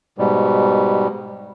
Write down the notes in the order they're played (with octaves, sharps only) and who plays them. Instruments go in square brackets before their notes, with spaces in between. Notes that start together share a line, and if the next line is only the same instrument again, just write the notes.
[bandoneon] G#2 B2 G3